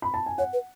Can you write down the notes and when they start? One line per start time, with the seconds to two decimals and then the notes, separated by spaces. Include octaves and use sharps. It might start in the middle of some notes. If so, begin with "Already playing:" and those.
0.02 B5
0.14 A5
0.26 G#5
0.38 C#5 F#5
0.53 B4